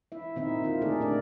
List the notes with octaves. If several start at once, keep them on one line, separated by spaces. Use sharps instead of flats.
E4 E5
A#2 D#3 C4 D#4 E4 E5
E4 F4 A#4
D3 A3 D#4 G#4 A4 D5
A#2 A3 D4 G4 A#4 D5